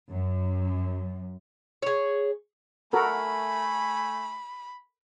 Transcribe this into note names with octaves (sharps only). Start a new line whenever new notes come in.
F#2
G#4 C#5
A3 F#4 A4 A#4 G#5 B5